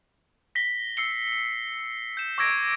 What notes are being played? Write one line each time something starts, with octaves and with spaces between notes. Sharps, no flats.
A#6 B6 G7
E6 C7 C#7 G7
G6 E7
C#6 D6 E6 G#6 A#6 D7